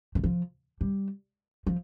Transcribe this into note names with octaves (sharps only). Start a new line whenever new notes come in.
D#3
F3
G3
F3